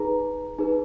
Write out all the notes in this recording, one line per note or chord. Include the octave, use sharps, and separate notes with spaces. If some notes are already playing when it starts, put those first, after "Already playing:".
Already playing: D#4 G#4 B4 A#5
D#4 G#4 B4